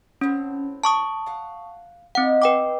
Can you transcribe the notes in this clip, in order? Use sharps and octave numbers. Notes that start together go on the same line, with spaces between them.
A2 C4 C#4 C#5
A5 C#6 D#6
F5 F#5
B3 C4 D#4 D#5 F#5
B4 G5 D6